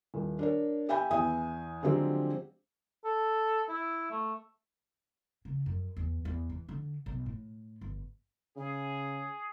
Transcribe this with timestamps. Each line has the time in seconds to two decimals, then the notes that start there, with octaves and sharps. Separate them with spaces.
0.14 D#1
0.39 D4 A#4 C#5
0.89 G4 E5 G5 G#5 B5 G6
1.11 E2 E3 E5 G#5 D#6
1.83 D3 F3 F#3 G#3 C4 G4
3.04 A4
3.68 E4
4.11 A3
5.45 C#3
5.66 F#2
5.97 E2
6.25 E2
6.50 E3
6.69 D3
7.06 B1
7.26 A2
7.81 G1
8.57 C#3 G#4